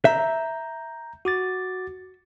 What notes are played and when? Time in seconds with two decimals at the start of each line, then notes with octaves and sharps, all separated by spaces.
0.05 E5 A#5 G6
1.25 F#4 D6 A6